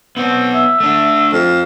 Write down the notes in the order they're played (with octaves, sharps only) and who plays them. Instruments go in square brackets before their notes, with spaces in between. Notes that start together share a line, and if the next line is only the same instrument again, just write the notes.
[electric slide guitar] B3 C#5 [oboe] C4
[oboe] E5
[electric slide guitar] A3 D4
[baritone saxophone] F2 [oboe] F4